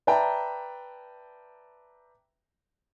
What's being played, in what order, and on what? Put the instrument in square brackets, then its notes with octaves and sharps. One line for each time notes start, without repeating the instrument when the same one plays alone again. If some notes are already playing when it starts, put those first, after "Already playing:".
[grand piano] B4 D5 E5 G5 A5 A#5